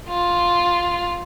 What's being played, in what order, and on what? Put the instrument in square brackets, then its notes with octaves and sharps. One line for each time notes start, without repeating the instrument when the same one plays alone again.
[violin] F4